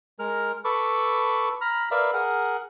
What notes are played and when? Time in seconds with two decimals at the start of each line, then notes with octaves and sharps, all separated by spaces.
0.19 G#3 A#4 F6
0.65 A4 B4 B5 C#6 D6
1.61 A#5 B5 F6
1.91 A#4 B4 D5 E5 F5 B5
2.14 G#4 A#4 F#5